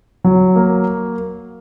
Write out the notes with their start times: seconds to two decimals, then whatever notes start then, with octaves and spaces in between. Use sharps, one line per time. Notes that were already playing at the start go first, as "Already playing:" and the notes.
0.24 F#3
0.56 A#3